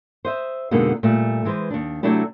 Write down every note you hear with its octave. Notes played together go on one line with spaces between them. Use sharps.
C5 D#5 E5
F2 B2 D3 G#3 A#3 D#4
A#2 G3 A3
E3 G#3 B4 C5
D#2 D4
C3 F#3 A3 D4 E4 G4